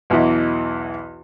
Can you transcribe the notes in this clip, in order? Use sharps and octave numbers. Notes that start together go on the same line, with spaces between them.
B1 E2 E3 E4 D#5